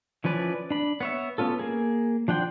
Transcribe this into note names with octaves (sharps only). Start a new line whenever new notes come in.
E3 F3 C#4 B4 D5
D4 B5
B3 C#5 E5
B3 C#4 F4 A4
A#3 G#4
F3 D4 F#5 G5 C6